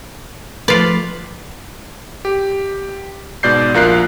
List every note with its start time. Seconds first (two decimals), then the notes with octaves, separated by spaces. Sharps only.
0.68 F3 A3 F4 B4 D5
2.25 G4
3.43 G#2 B2 D5 G6 C7
3.74 A#1 F4 A#4 F#6 C7